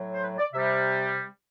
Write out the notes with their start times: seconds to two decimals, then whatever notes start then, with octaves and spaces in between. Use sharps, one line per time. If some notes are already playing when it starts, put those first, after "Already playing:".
Already playing: A2 F#3
0.13 C5
0.23 B4
0.39 D5
0.53 C3 E5
0.57 G3